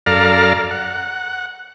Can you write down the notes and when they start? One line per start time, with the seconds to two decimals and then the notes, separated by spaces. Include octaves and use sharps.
0.06 F#2 A4 D5 F5 A#5 F6
0.71 F#5